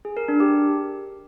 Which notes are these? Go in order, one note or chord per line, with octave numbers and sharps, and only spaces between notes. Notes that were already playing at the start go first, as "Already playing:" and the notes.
G#4
A#4
D4
G4